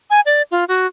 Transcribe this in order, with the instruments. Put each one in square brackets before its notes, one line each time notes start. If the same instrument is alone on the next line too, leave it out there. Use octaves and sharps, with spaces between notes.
[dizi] G#5
D5
F4
F#4